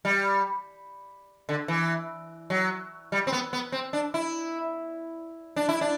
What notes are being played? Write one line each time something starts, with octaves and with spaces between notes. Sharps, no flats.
G3
D3
E3
F#3
G3
C4
B3
B3
C4
D4
E4
D4
E4
D4